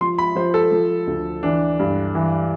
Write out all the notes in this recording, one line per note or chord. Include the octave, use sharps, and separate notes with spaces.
F3 C6
B5
F3 C5
A4
F3
D2
E3 D4
G2
E3